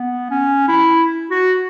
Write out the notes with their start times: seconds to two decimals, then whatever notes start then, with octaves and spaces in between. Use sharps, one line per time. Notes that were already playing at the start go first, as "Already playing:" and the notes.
Already playing: B3
0.31 C#4
0.69 E4
1.31 F#4